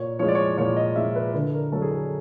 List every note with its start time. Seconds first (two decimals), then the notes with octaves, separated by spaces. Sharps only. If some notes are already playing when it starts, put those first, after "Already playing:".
Already playing: A#2 C#5
0.19 F3 G#3 C#5
0.28 D5
0.35 C#5
0.57 A#2 C#5
0.77 D#5
0.96 F3 G#3 E5
1.16 B4
1.34 D3 B4
1.54 A#4
1.72 F#3 A4
1.82 G#4
1.91 A4